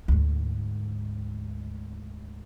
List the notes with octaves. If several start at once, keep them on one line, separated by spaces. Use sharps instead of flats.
D2 G#2